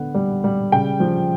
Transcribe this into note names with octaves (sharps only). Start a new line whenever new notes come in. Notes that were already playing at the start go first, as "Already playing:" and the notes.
Already playing: D3 B3 F#5
G3
G3
C#3 G5
F3